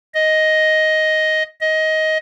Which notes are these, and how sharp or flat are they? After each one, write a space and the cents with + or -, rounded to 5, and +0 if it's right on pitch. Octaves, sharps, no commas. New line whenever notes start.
D#5 +5
D#5 +15